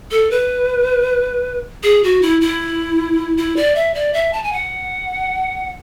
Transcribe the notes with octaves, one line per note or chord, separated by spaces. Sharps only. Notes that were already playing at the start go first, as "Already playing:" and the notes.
A4
B4
G#4
F#4
E4
E4
E4
D5
E5
D5
E5
A5
G#5
F#5